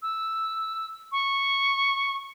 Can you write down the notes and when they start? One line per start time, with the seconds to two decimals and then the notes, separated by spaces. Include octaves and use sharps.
0.02 E6
1.12 C#6